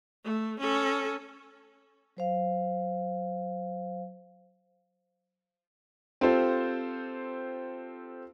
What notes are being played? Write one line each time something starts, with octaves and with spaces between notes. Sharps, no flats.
A3
C#4 A4
F#3 C5 F5
C4 F4 G4 A4 C5